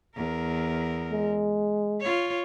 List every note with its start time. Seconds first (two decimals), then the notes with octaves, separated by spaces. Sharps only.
0.16 E2 A#4
1.12 G#3
2.01 F4 C#5